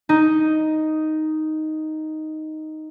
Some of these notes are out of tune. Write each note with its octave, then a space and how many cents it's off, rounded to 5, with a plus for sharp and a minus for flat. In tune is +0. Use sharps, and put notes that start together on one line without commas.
D#4 +0